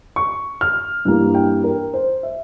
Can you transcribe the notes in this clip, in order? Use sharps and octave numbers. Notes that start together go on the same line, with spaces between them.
C#6
F6
G2 E3 G3 A#3
G5
A#4
C5
E5